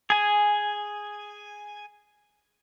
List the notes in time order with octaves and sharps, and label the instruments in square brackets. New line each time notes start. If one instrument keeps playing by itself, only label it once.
[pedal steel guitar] G#4 G#5